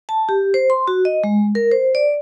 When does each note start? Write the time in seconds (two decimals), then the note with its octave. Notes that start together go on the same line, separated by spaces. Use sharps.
0.09 A5
0.29 G4
0.54 C5
0.70 C6
0.88 F#4
1.05 D#5
1.24 G#3
1.55 A#4
1.71 C5
1.95 D5